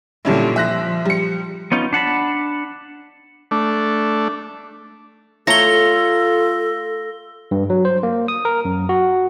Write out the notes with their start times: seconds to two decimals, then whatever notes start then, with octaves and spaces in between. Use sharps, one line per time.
0.25 A#2 D3 G3 C#4 E4
0.56 F3 E5 F#6 A#6
1.05 G3 C#7
1.72 B3 C#4 D#4 F4
1.93 D4 F#5 A5 B5
3.51 A3 D4
5.47 A3 F4 A4 C#5 A#5 A#6 G7
7.51 G2
7.70 F#3
7.85 C5
8.03 A#3
8.28 D#6
8.45 A#4
8.65 F#2
8.89 F#4